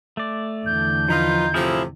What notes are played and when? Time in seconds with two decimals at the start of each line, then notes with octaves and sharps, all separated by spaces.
0.17 A3 D5
0.66 E2 D3 G6
1.09 F3 D#4 F4 B4 F6
1.54 A2 C3 F3 E4 G#4 F6